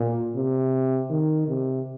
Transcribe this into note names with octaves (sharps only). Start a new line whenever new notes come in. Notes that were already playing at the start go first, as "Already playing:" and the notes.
Already playing: A#2
C3
D#3
C3